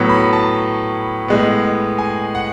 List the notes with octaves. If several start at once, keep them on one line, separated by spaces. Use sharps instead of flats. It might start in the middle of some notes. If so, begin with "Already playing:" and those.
Already playing: A2 F#3 B3 C#5
B5
A5
A2 G#3 B3
G#5
F#5